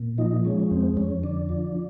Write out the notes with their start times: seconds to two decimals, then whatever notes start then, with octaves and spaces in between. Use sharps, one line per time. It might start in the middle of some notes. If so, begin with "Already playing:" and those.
Already playing: A#2
0.18 F3 D#4
0.45 G#3 C#4
0.71 F2 C4
0.97 F2 C#4
1.23 D3 D4
1.49 F3